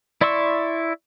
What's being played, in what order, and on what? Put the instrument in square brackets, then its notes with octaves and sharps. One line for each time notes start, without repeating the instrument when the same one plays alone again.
[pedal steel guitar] E4 D5 C6 C#6 E6